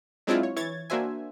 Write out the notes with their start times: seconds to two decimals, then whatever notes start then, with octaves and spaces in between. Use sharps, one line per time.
0.27 F#3 G#3 C4 D4 E4 F4
0.43 C#5
0.56 E3 C#5 G#6 A6
0.90 A#3 D4 F#4 C5 E5 G#5